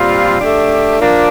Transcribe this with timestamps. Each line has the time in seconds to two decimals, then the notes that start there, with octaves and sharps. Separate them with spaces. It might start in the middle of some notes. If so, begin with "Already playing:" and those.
Already playing: A#2 G3 C4 F4
0.38 A3 D4 G4
0.98 F3 A#3 D4